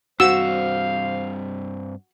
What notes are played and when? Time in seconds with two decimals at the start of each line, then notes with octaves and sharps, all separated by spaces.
0.20 G2 C4 F#4 C5 F5 E6